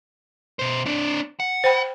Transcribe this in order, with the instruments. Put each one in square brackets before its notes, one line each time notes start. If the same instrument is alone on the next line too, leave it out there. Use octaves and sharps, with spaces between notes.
[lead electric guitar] B2 C5
C4 D4
F#5
[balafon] C5 G5 B5